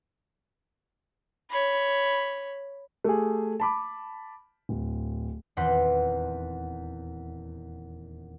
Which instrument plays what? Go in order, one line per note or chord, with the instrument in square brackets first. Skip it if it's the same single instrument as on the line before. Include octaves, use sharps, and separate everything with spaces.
[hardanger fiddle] C#5 B5
[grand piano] A3 G4 G#4
A5 B5 D6
D1
[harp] D#1 E2 C4 F#5 C6 B6